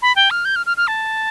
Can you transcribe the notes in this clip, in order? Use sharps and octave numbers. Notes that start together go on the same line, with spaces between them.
B5
G5
F6
G6
F6
F6
F6
A5